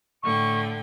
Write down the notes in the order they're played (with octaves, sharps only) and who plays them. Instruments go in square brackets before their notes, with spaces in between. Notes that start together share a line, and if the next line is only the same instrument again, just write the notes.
[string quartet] A2 D3 G5 [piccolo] C#6